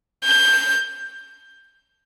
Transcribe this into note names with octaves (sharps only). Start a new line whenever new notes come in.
G6